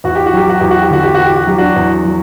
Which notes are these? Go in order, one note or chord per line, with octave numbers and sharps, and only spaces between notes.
E2 F#4
G4
F#4
F#3 G4
F#4
E2 G4
F#4
G4
D3 F#4
G4
E2 F#4
G4
F#4
F#3 G4
D4 F#4
E2
F#3